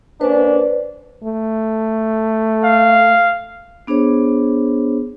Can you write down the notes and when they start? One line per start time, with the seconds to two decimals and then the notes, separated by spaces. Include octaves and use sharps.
0.21 A#3 C#4 D4 B4 C5 D5
1.24 A3
2.63 F5
3.87 B3 D4 G#4 C5 C#5